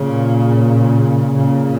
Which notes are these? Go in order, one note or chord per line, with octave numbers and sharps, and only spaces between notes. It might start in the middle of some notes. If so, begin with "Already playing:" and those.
Already playing: A#2 C#3
A#2 C#3